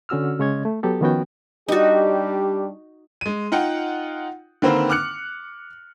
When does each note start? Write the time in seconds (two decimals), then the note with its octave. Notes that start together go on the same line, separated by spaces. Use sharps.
0.09 D3 C#4 F#4 E6 F6
0.39 C#3 G#3 C#4 C#5 D#5 G#6
0.65 A3
0.83 F#3 B3 G4 A4
1.01 D#3 F3 B3 C#4 F#4 G5
1.68 G3 D4 D#4 F#4 G4
3.21 G#3 D#7
3.52 D#4 F4 F#5 G5
4.62 D3 D#3 A#3 C4 B4 C5
4.90 D6 F6 F#6 C#7